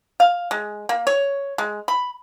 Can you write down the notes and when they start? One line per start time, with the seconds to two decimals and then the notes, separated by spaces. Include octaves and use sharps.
0.20 F5
0.51 G#3
0.89 A#3
1.07 C#5
1.58 G#3
1.88 B5